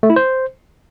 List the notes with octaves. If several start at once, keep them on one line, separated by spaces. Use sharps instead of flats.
A3
E4
C5